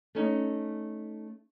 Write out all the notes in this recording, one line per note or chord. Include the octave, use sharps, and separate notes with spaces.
A3 C#4 D#4